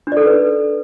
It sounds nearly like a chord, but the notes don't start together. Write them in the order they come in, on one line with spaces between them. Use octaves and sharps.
D4 D5 A4 D#4 B4